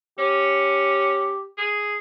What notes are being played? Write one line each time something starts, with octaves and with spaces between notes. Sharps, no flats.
C#4 G4
G#4